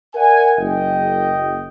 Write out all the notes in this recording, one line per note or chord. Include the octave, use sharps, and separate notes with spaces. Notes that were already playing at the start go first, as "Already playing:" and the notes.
A#4 D5 E5 F#5 G#5
F#1 D#5 G5